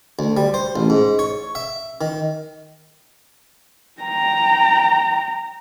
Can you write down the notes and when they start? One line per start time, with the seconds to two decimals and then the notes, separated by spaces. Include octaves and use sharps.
0.19 D2
0.37 G3
0.54 C5
0.76 A1
0.90 G#2
1.19 C#5
1.55 E5
2.01 D#3
4.01 G5 A#5